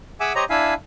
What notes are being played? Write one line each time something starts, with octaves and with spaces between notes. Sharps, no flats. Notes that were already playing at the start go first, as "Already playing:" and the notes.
G#4 E5 F#5 G#5 D6 E6
G4 C5 C#5 D#5 A#5
D4 E4 E5 F5 G#5